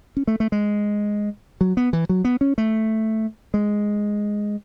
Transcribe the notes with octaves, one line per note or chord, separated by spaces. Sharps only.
C#4
A3
A3
G#3
F#3
B3
E3
F#3
B3
C#4
A3
G#3